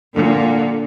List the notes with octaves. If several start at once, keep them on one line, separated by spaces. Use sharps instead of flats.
A#2 D3